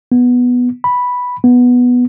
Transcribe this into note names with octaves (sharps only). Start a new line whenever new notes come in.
B3
B5
B3